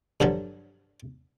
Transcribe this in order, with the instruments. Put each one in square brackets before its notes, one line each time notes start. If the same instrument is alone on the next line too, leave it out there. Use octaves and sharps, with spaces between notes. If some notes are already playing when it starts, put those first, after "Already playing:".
[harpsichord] G2 D3 F3 F#3